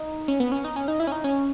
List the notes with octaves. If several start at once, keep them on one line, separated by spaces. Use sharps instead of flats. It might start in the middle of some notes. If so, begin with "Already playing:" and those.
Already playing: D#4
C#4
B3
C#4
D#4
C#4
D#4
E4
C#4
D#4
C#4